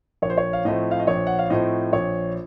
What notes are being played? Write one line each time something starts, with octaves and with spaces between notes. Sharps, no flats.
A#1 C#5
C5
C#5
F5
A2 F3 A3 C4 D#5
F5
D#5
A#1 C#5
F#5
F5
A2 F3 A3 C4 D#5
A#1 C#5